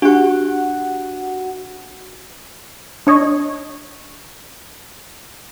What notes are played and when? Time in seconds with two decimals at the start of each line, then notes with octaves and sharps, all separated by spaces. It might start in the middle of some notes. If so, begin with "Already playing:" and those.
0.02 D4 F#4 G4 F#5
3.07 D4 C#5 D#5